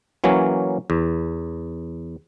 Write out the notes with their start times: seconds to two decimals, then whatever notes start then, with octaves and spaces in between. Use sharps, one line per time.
0.24 E3 F#3 A#3 C#4
0.90 E2